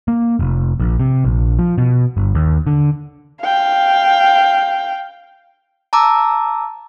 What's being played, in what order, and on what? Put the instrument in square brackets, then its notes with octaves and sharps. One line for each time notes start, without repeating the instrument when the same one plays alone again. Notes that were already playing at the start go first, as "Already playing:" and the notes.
[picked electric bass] A#3
F1
A#1
C3
A#1
F3
B2
G1
D#2
D3
[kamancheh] F5 G5
[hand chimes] A5 A#5 D6 E6